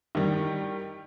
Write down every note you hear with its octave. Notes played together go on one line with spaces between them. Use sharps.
D#3 G3